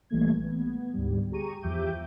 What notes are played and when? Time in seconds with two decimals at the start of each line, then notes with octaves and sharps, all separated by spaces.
0.10 A#1 E3 G3 A3 A#3 G#6
0.44 B3
0.93 D2 G#2 G3
1.31 G4 G#4 A#5 C#6 D#7
1.62 E2 F3 G4 E5 D6 G6